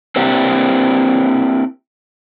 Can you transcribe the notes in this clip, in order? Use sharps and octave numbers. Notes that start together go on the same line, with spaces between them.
A#3 C4 D4 E4 G4